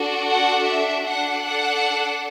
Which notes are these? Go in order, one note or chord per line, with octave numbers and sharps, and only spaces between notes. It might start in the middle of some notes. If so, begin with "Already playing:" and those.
Already playing: D4 F#4 A4
F#5
E5
D4 A4 F#5
F#5